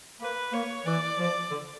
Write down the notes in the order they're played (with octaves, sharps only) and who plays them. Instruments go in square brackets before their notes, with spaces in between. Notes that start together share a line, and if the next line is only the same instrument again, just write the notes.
[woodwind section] A#3 [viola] B4
[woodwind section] A#3 [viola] C#5
[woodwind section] E3 [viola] D5
[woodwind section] F3
D3